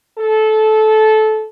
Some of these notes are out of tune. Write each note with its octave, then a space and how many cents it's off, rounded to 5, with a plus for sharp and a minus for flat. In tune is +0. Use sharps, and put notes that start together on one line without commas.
A4 -20